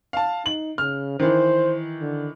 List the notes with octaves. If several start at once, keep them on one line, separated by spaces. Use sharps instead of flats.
F5 A5
D#4 F#7
C#3 F6
D#3 E3 C5
D3